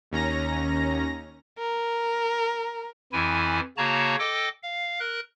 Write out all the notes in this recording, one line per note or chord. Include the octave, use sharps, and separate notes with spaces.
D#2 C#4 A#5 A#6
A#4
F2 E3 E4 G#5
C#3 A#3 F#4 C#5 A5 A#5
A4 D#5 G5 D6
F5
A#4 F#6